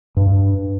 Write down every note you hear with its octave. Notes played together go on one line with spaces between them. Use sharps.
G2